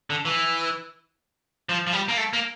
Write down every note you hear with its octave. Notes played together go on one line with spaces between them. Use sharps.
D3
E3
F3
F3
G3
A#3
A3
A#3